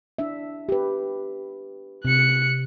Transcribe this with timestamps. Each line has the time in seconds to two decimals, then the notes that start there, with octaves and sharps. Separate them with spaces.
0.18 D4 E4 E5
0.69 G4 B4
2.05 C3 F#6 C#7